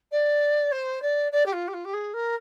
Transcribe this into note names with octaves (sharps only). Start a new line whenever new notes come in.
D5
C5
D5
D5
G4
F4
G4
F4
G4
G#4
A#4